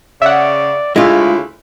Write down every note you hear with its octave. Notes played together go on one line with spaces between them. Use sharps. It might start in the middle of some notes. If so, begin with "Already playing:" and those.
C#3 D5 E5 F#5
D2 C#3 G#3 E4 F4 G#4